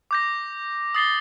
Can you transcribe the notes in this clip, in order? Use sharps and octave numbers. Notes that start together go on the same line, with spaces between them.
D6 G6 A#6
D#6 A6 C7 G7